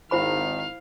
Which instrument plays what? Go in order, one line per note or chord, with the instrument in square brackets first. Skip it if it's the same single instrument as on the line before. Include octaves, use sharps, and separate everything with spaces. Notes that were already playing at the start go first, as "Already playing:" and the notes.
[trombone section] G#1 D#3 [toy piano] E4 C5 B5 [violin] F5